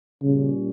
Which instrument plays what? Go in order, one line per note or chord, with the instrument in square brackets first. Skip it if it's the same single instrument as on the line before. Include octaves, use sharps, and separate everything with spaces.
[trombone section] A#2 G3 C#4 [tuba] C#3